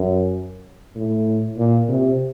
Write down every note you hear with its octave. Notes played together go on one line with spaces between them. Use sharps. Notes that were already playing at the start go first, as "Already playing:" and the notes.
Already playing: F#2
A2
A#2
C3